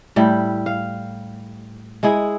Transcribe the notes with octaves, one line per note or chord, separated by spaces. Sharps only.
A2 G3 E4
F5
G#3 E4 G#4